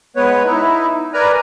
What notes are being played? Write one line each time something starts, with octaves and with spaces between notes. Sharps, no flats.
G#3 B3 B4 C#5
D#4 E4
A#4 B4 D5 G#5 A#5